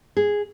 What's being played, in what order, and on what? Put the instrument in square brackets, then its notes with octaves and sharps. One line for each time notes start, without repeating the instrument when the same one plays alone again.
[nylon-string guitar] G#4